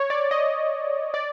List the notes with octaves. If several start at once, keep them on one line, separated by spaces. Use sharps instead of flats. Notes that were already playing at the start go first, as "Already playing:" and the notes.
Already playing: C#5
D5
D#5
D5